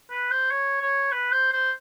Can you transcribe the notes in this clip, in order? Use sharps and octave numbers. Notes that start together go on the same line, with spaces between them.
B4
C5
C#5
C#5
B4
C5
C5